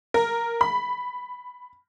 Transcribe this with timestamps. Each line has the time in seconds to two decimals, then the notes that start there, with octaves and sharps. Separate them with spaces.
0.14 A#4
0.61 B5